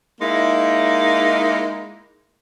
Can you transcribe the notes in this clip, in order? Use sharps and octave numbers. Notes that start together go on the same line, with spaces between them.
G#3 A#3 D#4 E4